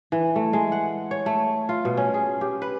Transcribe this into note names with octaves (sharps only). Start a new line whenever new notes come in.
E3
A3
G#3
F#5
C#5
A3
F4
B2
C#4
G#4
G4
B4